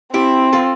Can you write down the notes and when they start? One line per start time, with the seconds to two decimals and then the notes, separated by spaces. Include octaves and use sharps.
0.14 C4 E4 G4
0.52 F4 A4